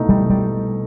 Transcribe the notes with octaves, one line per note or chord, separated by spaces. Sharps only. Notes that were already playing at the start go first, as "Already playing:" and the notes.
Already playing: C2 B2 A3 D#4
G3
G3